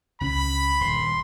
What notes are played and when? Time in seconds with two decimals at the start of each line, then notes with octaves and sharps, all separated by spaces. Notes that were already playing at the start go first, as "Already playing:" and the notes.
0.21 C#2 C#4 B5
0.81 D#1 G2 C6